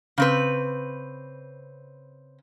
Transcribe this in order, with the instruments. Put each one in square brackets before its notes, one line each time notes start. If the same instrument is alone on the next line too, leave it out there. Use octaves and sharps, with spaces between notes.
[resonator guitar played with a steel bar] C#3 C4 B4